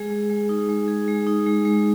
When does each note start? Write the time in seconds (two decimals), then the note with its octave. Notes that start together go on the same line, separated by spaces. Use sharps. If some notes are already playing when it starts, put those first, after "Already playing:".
Already playing: G#3 G#4
0.11 G#3
0.30 G#3
0.49 D#4
0.69 G#3
0.88 G#4
1.08 G#3
1.27 D#4
1.46 G#3
1.65 G#3